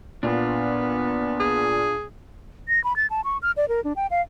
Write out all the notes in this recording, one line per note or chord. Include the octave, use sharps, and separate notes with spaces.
A#2 B3 D4 F4
G#4
A#6
B5
A6
A5
C#6
F6
D5
A#4
D4
G5
F5